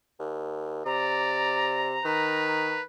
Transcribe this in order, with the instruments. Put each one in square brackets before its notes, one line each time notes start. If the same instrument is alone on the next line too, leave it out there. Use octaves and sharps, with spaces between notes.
[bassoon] D#2
[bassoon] C3 [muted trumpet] D5 [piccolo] A#5
[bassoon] D#3 [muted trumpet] B4